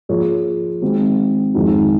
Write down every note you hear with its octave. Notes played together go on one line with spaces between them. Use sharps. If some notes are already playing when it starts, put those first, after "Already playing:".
F3 A#3 F4 G#4 C#5
D#3 G#3 C4 F#4
F2 D#3 G#3 D#4 F#4